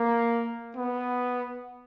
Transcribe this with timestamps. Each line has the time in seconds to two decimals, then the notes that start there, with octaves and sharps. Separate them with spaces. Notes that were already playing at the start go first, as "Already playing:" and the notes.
Already playing: A#3
0.77 B3